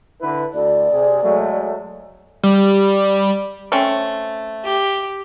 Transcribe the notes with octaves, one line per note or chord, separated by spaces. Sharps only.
D3 E4 B4
D2 A4 D5
C3 G#4
F#3 G#3 A3
G3
A3 C4 C#4
G4